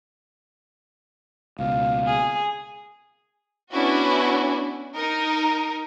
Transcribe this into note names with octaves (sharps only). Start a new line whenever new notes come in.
C#2 B2 F5
G#4
B3 C#4 D4 E4 F#4
D#4 A#4